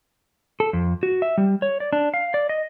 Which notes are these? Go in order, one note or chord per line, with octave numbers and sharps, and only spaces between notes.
A4
F2
F#4
E5
G3
C#5
D5
D4
F5
D5
D#5